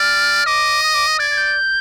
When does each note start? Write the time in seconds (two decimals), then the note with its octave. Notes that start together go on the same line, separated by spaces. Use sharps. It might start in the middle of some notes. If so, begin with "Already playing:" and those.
Already playing: D5 F6
0.46 D#5 D6
0.83 D#6
0.94 D6
1.07 D#6
1.19 D5 G#6
1.31 G#6
1.37 G6